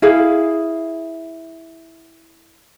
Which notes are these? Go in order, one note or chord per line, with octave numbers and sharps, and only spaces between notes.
E4 G#4 F5